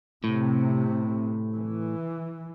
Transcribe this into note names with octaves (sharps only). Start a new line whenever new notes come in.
A2 C3
E3